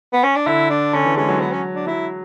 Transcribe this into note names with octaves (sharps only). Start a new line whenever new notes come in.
B3
C#4
D4
D3 E4
D4
D3 C#4
E3
G#3 C#4
F#3
B3
C#4
D4
F#3 E4